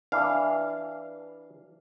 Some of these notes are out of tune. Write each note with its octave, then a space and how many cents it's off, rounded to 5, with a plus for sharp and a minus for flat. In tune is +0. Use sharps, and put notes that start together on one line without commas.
E3 -10 D4 +0 F5 -10